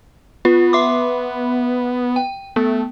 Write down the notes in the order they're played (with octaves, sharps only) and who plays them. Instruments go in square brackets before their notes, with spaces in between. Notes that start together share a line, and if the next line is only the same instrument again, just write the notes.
[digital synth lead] B3 [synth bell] F4
[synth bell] E5 C6 D6
G5
[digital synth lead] A3 [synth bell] B3